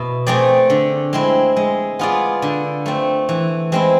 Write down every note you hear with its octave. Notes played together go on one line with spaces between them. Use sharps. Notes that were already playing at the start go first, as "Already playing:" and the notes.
Already playing: B2 E4
A3 C4 G#4 D5
D3
G#3 C4 E4
G#3
B3 F4 G#4 D5
D3
A3 C4
E3
G#3 C4 E4